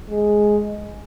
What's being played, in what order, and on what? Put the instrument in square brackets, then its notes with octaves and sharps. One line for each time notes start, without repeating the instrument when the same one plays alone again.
[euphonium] G#3